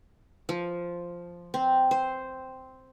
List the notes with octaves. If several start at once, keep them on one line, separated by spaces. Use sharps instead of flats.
F3
C4
C5